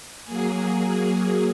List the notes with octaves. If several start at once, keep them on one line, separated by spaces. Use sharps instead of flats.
F#3 A#3 G#4